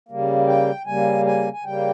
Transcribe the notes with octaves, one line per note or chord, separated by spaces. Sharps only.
C#3 G3 A#3
G5
C#3 G3 A#3 G#5
G#5
G#5
C#3 G3 A#3 G5